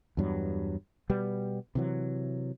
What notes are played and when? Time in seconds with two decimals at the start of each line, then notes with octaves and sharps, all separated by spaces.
0.17 E2 G2 F#3
1.10 B2 G3 B3
1.75 C3 E3 F#3